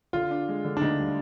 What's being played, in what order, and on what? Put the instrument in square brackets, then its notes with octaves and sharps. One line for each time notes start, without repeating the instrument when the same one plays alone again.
[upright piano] D3 [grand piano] F4
[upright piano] D4
G#3
D3
[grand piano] D4
[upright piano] D2 [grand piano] D#4
[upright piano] G3